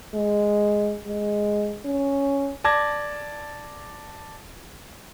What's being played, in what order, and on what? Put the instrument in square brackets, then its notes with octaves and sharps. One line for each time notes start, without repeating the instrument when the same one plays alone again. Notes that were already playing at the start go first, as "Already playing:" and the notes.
[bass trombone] G#3
G#3
C#4
[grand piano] D5 A5 D6 G#6 A#6